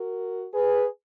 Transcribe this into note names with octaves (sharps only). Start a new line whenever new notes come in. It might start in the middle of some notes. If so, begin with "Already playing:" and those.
Already playing: F#4 A#4
G#4 B4